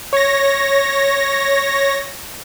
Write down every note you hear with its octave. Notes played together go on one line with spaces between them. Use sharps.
C#5 A#6